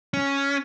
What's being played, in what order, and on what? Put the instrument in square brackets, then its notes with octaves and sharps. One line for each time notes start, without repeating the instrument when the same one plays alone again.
[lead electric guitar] C#4